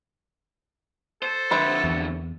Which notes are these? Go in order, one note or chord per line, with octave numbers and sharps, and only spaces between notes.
A4 C5
F2 D3 B4 C5 E5
E2